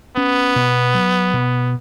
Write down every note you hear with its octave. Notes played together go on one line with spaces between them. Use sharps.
B3 C#4
B2
F#3
B2